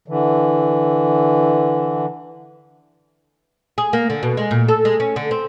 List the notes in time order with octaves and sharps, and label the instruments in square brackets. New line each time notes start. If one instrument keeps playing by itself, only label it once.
[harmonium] D3 E3
[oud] G#4
A#3
D3
B2
G#3
A#2
A4
G#3
C#4
D3
C4